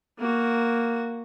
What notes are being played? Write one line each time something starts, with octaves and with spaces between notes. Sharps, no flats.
A#3 F#4